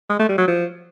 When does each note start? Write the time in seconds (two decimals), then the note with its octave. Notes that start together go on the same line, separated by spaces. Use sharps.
0.10 G#3
0.20 A3
0.29 G3
0.38 F#3
0.48 F3